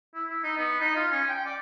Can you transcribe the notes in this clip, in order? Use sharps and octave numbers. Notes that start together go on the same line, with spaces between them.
E4
E4
D#4
B3
D#4
F4
C#4
G5
D5